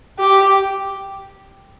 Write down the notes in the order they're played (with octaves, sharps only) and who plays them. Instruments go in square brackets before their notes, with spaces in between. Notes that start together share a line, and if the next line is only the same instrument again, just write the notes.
[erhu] G4